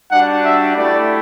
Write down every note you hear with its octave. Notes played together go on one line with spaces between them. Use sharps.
G3 D4 F#4 F#5
E5
A3 E4 G4 D5